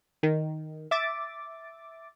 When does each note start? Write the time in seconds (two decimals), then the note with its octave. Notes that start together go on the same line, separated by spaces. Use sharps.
0.23 D#3
0.91 E5 D6 A6